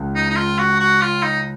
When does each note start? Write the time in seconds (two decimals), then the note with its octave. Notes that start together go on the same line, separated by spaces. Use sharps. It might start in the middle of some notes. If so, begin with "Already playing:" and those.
Already playing: C#2 C#3 C#4
0.15 D#4
0.30 D#4
0.36 F4
0.58 F#4
0.80 F#4
1.02 F4
1.23 D#4